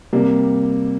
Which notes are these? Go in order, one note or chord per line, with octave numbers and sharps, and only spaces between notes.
C3 G3 A#3